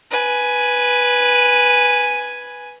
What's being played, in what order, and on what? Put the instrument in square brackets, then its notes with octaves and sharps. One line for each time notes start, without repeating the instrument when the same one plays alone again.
[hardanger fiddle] B4 G#5